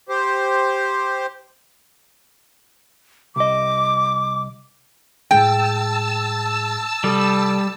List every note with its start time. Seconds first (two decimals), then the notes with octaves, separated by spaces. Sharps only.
0.09 G4 C5
3.36 C2 D#5 D6
5.31 A2 G#3 G#4 G5 A5 E6
7.04 C3 G3 A4 D#6